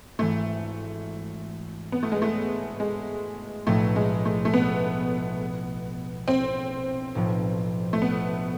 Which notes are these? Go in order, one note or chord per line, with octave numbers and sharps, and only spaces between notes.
G#1 G#2 E3 A3
B3
A3
G#3
A3
G#3
B1 A2 F3 A3
G#3
A3
A3
B3
C4
B1 A2 F3
A3
B3